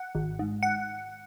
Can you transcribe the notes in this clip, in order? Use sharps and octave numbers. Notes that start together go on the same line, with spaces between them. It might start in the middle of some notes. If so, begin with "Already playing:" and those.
Already playing: F#5
G#1
G#2
F#5